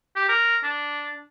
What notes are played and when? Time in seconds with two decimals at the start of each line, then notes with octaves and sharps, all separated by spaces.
0.16 G4
0.28 A#4
0.64 D4